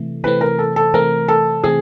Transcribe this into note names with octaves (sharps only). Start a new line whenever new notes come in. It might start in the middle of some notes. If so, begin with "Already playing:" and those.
Already playing: C3 E3 A3
C3 E3 A3 C4 B4
A#4
A4
A4
C3 E3 A3 C4 A#4
A4
C3 E3 A3 C4 G#4